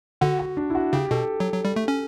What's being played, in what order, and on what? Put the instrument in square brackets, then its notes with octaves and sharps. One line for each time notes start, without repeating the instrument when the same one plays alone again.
[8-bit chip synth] D3 [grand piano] F#4
[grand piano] F#4
D4
E4
F#4
[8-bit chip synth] C#3 [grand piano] G4
[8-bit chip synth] B2 [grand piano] A4
[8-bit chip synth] F#3
F#3
G3
A3
C#4